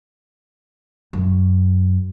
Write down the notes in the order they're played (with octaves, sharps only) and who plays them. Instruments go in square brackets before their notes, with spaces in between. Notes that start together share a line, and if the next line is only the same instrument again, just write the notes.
[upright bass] F#2